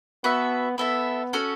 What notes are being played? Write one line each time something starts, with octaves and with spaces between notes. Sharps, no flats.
B3 F#4 B4 E5 A5
B3 E4 A4 E5
C#4 F#4 A4